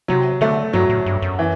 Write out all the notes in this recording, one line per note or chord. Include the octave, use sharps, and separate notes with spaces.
C3 F#3
D3 A3
G2 F#3
A2
G2
F#2
E3